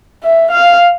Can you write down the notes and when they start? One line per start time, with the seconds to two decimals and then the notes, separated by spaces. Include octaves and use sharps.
0.23 E5
0.51 F5